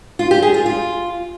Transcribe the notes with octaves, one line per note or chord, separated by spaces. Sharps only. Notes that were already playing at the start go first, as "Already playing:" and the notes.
F4
G4
G#4
F4
F4